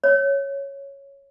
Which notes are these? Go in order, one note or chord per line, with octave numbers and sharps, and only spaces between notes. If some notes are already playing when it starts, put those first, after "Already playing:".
C#5